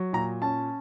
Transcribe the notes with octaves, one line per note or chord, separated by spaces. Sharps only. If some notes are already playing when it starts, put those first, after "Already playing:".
Already playing: F#3
A#2 A#5
C#4 A5